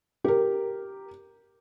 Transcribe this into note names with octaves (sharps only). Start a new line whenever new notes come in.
G4 A#4